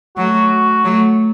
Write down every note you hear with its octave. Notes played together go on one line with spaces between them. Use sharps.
F#3 A3 F#4
F#3 A3